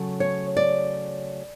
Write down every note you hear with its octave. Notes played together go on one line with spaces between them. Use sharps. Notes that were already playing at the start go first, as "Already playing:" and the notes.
Already playing: C#3 F#3 A3
C#5
D5